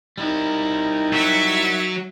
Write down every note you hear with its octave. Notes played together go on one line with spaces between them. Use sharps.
G3 D#4 E4 A#4
F#3 F#4 E5 A6